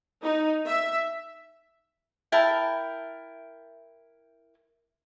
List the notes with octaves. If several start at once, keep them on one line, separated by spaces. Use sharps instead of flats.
D#4
E5
E4 A#4 G5 A5